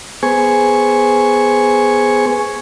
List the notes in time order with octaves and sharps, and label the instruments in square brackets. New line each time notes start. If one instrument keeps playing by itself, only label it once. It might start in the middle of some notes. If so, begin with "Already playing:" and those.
[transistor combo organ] B3 G#4 C5 G#5 C#6